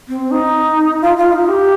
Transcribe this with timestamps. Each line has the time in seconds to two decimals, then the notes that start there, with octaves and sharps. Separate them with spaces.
0.09 C4
0.31 D#4
1.02 F4
1.17 F4
1.32 D#4
1.47 G4